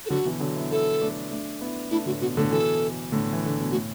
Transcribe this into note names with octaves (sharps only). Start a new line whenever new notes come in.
A4
D3 F#3 F#4
B2 E3
D3 F#3
B3 E4
B3 E4 A4
A3 D4
A3 D4
B3 E4
A3 D4 E4
A2 D3 F#4
B2 F#4
A2 D3 A4
B2 E3 A4
A2 D3
E3
D3
B2
A2 F#4